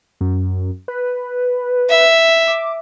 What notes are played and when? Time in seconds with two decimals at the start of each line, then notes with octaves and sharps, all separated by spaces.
0.21 F#2
0.88 B4
1.90 E5
2.48 D6